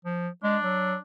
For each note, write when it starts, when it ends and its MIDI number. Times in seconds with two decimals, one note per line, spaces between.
0.05 0.28 53
0.43 0.57 56
0.43 0.98 62
0.63 0.96 54